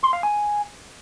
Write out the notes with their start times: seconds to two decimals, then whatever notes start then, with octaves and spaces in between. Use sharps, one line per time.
0.03 C6
0.13 F5
0.23 G#5